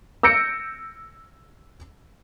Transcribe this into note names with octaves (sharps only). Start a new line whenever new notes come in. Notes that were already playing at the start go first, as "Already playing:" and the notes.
E6 G6 A#6 C#7 D7